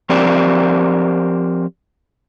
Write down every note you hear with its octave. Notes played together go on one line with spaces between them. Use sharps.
F3 C4 G4 A#4 C5 D5